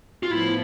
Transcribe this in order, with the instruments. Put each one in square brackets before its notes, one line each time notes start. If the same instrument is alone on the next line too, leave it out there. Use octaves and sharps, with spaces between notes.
[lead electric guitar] F4
[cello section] A2 F3 B3 [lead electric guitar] E4